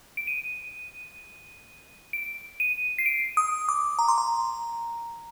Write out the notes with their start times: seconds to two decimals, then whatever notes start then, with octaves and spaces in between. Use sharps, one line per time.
0.17 D7
0.27 D#7
2.13 D7
2.60 D#7
2.98 C7
3.06 D7
3.37 D#6
3.69 D6
3.99 A#5
4.08 C6
4.18 A#5